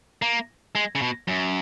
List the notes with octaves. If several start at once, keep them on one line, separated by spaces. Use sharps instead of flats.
A#3
G#3
C#3
B2
F#2